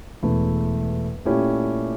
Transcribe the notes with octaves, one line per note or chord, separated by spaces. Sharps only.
E1 E2 E3 A3 E4
A#2 A3 C#4 E4 G4